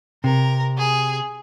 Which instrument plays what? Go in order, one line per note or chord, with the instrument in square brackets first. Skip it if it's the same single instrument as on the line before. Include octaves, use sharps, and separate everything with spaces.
[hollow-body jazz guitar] C3 [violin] A#4
[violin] G#4